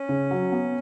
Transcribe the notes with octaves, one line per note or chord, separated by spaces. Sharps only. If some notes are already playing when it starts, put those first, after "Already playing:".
Already playing: C#4
C#3
F#3
B3